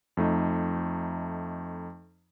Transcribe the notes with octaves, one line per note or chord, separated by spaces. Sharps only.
F2 A3 D#4